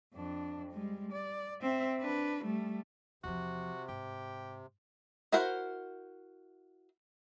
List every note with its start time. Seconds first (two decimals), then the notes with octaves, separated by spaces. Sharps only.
0.14 F2 D4
0.72 G3 G#3
1.12 D5
1.62 C4 E5
2.00 D4 B4
2.44 G3 A3
3.24 E2 C3 F3 F#4
3.89 G#2 G4
5.32 E4 F#4 A#4 C5 F#5